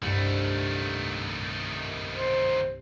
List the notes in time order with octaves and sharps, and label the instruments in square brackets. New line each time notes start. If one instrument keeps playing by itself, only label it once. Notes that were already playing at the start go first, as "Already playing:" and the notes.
[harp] C2 G2 [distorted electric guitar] D#3 A3
[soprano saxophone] C5